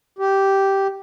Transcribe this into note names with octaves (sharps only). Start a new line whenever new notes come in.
G4